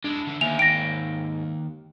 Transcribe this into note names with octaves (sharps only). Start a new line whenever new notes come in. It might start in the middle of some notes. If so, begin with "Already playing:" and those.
G#3 D4 E4
D3 E3
D#2 A#3 E5 G#5 F7
G#2 G5 A#6 D7